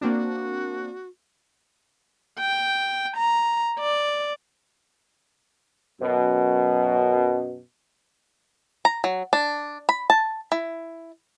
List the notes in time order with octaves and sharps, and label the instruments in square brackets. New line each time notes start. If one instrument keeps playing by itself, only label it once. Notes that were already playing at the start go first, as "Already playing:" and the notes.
[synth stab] A#3 C4 D4 [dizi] F#4
[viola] G5
A#5
D5
[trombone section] F#2 B2
[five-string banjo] A#5
F#3
D4
B5
A5
E4